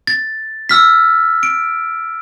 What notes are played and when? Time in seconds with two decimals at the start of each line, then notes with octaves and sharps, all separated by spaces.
0.07 A6
0.69 E6 F6 B6
1.43 D7